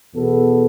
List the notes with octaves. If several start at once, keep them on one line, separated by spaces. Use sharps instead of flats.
E2 B2 B3 A4